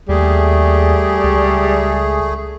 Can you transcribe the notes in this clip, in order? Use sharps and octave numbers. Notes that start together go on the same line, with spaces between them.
D#2 G3 A3 G#4
C#2